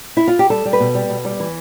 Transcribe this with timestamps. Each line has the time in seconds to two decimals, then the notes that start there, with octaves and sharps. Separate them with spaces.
0.17 E4
0.28 F4
0.39 G4
0.50 G3 A4
0.65 G3
0.73 B4
0.80 B2
0.95 G3
1.10 B2
1.25 G3
1.40 E3